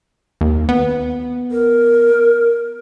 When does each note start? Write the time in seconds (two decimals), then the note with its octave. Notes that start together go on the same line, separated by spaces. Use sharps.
0.41 D#2
0.69 B3
1.51 A#4